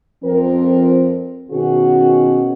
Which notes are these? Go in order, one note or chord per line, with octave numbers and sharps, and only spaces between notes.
F2 F3 C4 A#4
B2 D#3 C#4 F#4 G#4